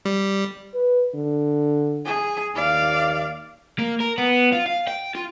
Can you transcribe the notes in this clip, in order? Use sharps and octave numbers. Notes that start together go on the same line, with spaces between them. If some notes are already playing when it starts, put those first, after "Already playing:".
G3
B4
D3
G#4 G#5
D#2 D5 F5
A#3
A#4
B3
F4
F5
G5
F4